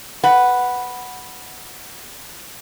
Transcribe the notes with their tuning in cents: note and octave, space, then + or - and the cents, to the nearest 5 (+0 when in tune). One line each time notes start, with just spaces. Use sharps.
B4 +0 F#5 +0